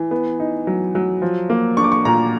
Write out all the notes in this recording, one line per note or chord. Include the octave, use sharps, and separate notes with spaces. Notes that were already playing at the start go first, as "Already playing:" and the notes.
Already playing: E3
B3
D#4
F#3
F#3
F3
A#3
D4 C#6
D6
C#6
A#2 A#5